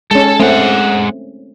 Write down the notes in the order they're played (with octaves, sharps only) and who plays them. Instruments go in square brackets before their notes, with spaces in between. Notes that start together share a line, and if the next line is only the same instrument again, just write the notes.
[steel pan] G#3 C#4 [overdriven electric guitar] A4
[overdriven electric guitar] G#3 F#5 [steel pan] A3 C4